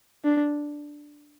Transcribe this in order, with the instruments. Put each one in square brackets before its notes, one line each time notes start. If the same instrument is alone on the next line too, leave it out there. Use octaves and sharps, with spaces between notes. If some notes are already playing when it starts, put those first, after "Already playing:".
[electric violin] D4